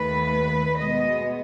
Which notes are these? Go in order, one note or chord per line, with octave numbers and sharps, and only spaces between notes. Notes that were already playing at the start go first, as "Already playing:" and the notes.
Already playing: D#2 D#3 A3 B4
B2 G#3 B3 D#5